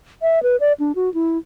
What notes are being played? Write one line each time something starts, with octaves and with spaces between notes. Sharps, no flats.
E5
B4
D5
D4
F#4
E4